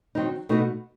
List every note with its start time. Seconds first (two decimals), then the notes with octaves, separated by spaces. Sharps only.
0.15 D#3 F#3 C4 D#4
0.49 B2 A3 D#4 F#4